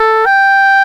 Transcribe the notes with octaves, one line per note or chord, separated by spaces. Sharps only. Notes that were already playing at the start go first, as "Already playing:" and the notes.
Already playing: A4
G5